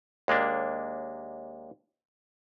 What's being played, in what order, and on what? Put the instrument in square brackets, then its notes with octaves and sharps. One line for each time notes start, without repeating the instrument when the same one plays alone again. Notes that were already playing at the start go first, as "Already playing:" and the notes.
[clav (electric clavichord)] D#2 G#3 A#3 D4